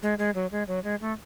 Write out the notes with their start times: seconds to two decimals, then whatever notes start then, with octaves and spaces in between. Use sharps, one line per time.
0.03 G#3
0.19 G#3
0.35 F#3
0.52 G#3
0.68 F#3
0.84 G#3
1.01 A3